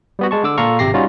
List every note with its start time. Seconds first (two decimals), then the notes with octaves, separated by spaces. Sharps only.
0.19 G3 B3 F#4
0.31 G#3 A5 C#6
0.44 D3 D6 E6
0.58 A#2 F4 A4 F5 A#5 C#6
0.79 G#1 C3 G4 A#6 C7
0.94 G3 C#4 D#4 F4 F#4